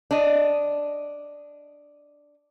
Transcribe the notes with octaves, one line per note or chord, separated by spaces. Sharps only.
D4 D#5